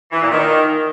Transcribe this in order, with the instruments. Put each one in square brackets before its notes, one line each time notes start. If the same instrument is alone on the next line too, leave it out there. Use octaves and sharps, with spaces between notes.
[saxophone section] E3
A#2
D#3